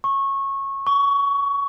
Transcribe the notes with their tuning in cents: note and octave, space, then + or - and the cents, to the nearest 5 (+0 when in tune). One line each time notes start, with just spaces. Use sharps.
C#6 -20
C#6 +20